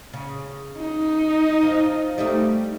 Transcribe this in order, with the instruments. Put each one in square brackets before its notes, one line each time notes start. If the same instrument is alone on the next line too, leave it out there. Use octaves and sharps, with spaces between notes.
[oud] C#3
[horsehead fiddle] D#4
[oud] F3
G3 A3 D#4